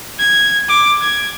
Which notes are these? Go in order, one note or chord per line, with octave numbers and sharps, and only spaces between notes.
G#6
D6
G#6